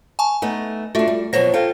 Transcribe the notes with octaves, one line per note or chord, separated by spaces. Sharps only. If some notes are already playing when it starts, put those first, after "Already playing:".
G#5 A5 C#6
A3 B3 D#4
A3 D4 F4 F#4 E5
G3
F2 B2 F#3 C5 A#6
F4 A4 G5